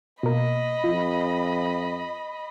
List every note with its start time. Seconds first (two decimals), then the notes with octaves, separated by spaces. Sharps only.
0.23 B2 A#3 D#5 B5
0.84 F2 F3